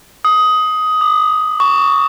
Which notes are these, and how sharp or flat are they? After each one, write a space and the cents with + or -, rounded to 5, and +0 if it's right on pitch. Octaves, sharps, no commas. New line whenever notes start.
D#6 +15
D6 +45
C#6 +15